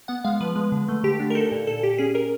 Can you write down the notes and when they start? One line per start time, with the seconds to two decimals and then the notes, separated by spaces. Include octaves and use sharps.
0.08 B3 F#5
0.24 G#3 F5
0.41 F3 B4
0.56 G#3
0.72 D3
0.89 A3
1.03 D3 G4
1.20 D4
1.30 A#4
1.35 D#4 A4
1.51 A#2
1.67 A#2 A4
1.83 A#2 G4
1.98 C#4 G#4
2.15 A#4